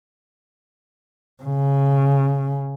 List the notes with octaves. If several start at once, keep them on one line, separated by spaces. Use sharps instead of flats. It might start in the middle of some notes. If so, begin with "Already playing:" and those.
C#3